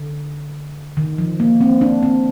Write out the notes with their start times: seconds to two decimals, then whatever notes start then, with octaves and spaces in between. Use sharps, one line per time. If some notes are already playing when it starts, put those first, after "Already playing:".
Already playing: D3
0.97 D#3
1.18 F3
1.40 A#3
1.61 C4
1.81 D4
2.03 C4